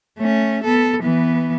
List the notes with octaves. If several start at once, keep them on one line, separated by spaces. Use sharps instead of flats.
A3 C#4
B3 A4
E3 B3